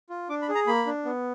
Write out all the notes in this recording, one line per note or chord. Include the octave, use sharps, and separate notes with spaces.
F4
D4 D6
B5
G#4
A#5
A#3 B5
D4
B3